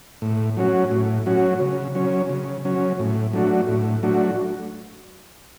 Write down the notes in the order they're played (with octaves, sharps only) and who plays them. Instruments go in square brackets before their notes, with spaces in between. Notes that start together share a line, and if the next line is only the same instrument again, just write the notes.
[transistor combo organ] A2
F#3 C#4 F#4
A2
F#3 C#4 F#4
C#3
F#3 C#4
C#3
F#3 C#4
A2
F#3 A3 D4 F#4
A2
F#3 A3 D4 F#4